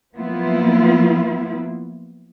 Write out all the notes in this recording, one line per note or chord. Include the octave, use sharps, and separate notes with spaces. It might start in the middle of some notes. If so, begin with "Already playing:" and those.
F3 F#3 A#3 B3 E4 F4